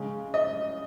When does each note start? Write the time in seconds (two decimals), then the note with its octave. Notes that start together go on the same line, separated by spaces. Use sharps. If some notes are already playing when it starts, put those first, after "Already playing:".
Already playing: C#3 G#3 C#4
0.34 D#5